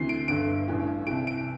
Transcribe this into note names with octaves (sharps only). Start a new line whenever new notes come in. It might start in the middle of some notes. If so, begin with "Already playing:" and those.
Already playing: D2 C3 E3 C7
D7
G1 G2 D3 D7
A1 G2 E3
C2 C3 E3 D7
D7